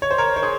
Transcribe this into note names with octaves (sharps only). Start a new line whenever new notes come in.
C#5
C5
A#4 C#5
C#5
G#4 C5